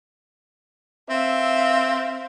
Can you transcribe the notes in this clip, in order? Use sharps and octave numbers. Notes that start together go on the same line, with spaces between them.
C4 E5 F5